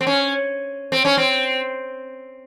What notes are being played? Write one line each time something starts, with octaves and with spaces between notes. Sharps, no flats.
C4
C#4
C4
C#4
C4